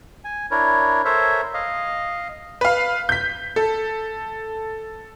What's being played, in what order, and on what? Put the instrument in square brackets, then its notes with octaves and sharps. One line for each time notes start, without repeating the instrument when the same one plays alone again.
[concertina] G#5
D4 E4 A#4 C#5
A4 A#4 C5 C#5 E5
D#5 F5
[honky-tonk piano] B4 F5
G6 B6
A4